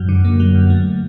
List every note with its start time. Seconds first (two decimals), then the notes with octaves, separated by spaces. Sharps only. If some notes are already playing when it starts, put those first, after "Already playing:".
Already playing: F#2 F#3
0.09 D3
0.25 A#3
0.40 F#3
0.55 F#2
0.70 A3